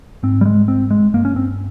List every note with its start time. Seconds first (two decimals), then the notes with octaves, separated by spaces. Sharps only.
0.23 G#2 C4
0.41 G3
0.45 G#3
0.68 C4
0.91 G#3
1.13 G2 A#3
1.25 C#4
1.36 C4